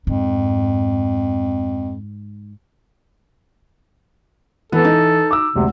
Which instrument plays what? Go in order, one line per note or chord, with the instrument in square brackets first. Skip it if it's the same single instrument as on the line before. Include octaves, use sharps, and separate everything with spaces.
[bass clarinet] F2 [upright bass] G#2
[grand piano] E3 [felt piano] B3 [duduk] A4
[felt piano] D#4
[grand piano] D6 E6
[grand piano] G#1 D2 [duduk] C3